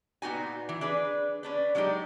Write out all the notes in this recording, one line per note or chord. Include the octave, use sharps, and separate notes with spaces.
A#2 B3 D#4 F#4 G#5
E3
D4 G#4 B4
C#4 D4 B4
F#3 G#3 D4 D#4 G4